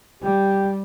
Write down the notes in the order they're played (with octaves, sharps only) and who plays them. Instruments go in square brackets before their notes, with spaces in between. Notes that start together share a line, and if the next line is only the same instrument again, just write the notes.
[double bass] G3 [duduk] G4